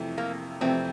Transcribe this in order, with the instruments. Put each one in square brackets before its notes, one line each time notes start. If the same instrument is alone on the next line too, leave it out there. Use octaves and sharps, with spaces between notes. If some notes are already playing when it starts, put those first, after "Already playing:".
Already playing: [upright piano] F2 C3 E3 A3 E4
[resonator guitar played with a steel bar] A#3
[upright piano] F2 C3 E3 A3 E4 [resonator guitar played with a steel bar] C4